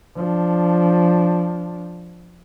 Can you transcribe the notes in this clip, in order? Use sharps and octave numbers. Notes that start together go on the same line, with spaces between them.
F3 D4